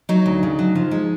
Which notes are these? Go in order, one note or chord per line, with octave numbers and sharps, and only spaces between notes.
F#3 D#4
D2
C#3
F#3
F3
G#3